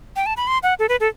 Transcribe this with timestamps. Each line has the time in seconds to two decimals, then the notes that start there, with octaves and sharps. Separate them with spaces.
0.16 G5
0.26 A5
0.37 B5
0.47 C6
0.63 F#5
0.79 A4
0.89 B4
1.00 A4